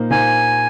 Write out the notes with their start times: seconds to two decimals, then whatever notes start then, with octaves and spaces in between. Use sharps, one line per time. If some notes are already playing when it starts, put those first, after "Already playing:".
Already playing: A#2 A#3 D#4 C5
0.10 A#2 A#3 D#4 C5 G#5